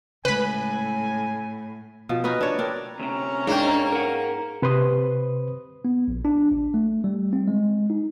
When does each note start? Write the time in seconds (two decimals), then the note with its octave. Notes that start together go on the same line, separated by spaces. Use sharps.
0.25 A2 C#3 G#3 B4 G#5 B5
2.09 B2 F3
2.24 C#4 D#4 F#4 B4
2.41 D4 C#5
2.58 C4 D4 A#4
2.99 D2 C3 C#4 A#5
3.47 G#2 A#3 D4 G5
3.92 A#4 F#5
4.62 C3 B4 C5 C6 D#6
5.85 B3
6.08 A#1
6.25 D4
6.52 A1
6.74 A3
7.04 G3
7.33 C4
7.48 G#3
7.90 D#4